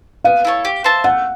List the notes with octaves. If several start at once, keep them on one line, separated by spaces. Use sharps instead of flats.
B3 F5
E4 A4 C#5
G4
C5 E5 A5
A3 F#5